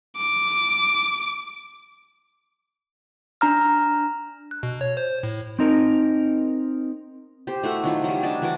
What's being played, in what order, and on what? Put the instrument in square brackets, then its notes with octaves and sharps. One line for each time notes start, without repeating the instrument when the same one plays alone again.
[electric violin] D6
[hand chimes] D4 A#5 F6
[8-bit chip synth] F#6
B2
C#5
C5
A2
[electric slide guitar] C4 D#4 A#4
[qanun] G4 C5
A3 E4 F#4
D#3 F#3 F4
F#3 G3
D4 D5 D#5 A5
E3 F#4 D6